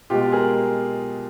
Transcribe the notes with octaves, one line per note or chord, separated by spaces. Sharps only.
B2 G#3 F4 G4
G#4 A#4